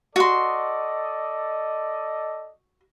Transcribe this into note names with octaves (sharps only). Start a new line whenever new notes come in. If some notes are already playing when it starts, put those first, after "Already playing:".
F#4 A4 D5 D#5 C6